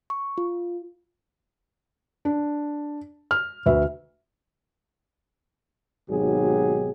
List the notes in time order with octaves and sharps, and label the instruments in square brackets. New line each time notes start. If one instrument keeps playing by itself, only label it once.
[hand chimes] C#6
F4
[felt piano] D4
F6
D2 B4 E5
[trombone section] G#1 B2 F#3 D#4 G4 G#4